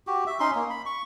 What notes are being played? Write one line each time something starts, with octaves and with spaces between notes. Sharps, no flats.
F#4 G4
E5
C#4 D#4 C6
A#3
B5
C#6